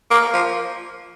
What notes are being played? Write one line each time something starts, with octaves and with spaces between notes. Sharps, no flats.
A#3
F3